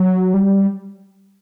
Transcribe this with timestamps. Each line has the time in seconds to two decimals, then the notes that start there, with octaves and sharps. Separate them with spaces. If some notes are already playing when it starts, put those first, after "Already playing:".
Already playing: F#3
0.34 G3